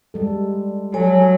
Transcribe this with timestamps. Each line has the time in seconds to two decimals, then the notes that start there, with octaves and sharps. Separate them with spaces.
0.14 G3 G#3 A4
0.94 F#3 A4 C#5 G#5